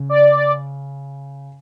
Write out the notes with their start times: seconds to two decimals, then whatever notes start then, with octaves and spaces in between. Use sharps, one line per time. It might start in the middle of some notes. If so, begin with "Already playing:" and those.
Already playing: C#3
0.09 D5